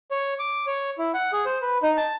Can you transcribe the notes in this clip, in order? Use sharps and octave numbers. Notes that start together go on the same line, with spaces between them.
C#5
D6
C#5
E4
F#5
G#4
C5
B4
D#4
A5